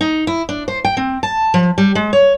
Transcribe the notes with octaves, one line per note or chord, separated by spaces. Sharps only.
D#4
E4
D4
C5
G5
C4
A5
F3
G3
G#3
C#5